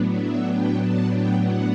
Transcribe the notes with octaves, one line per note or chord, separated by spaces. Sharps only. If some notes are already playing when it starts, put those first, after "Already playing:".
Already playing: A2 F#3 B3 D4
E5
G5
A5
G5
F#5